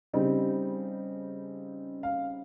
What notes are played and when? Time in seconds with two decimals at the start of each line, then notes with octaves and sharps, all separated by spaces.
0.13 C#3 G3 C4 D#4
2.03 F5